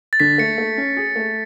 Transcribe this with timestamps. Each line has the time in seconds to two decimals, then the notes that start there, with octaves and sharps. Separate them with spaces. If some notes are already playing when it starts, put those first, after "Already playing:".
0.13 A6
0.20 D3 B6
0.38 A3 C#7
0.58 A3
0.77 C#4
0.97 G#4
1.16 A3